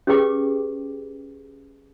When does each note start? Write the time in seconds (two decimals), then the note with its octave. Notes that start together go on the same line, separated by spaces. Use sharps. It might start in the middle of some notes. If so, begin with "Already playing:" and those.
0.07 C#4 G4 G#4 B4 G5 D6